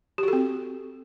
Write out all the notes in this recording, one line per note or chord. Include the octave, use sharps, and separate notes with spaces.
C4 F#4 G4 A4